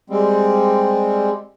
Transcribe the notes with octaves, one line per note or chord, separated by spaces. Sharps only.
G3 G#3 C4